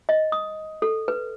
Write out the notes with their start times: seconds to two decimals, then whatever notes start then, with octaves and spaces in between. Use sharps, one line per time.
0.09 D#5
0.32 D#6
0.82 A4
1.08 B4